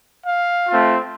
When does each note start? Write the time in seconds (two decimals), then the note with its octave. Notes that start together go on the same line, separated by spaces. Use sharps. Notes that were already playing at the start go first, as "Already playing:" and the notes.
0.26 F5
0.67 A3 C4 F4